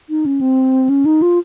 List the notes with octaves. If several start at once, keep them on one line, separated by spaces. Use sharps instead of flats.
D#4
C#4
C4
C#4
D#4
F4